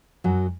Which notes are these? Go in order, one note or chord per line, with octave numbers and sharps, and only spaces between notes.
F#2 F#3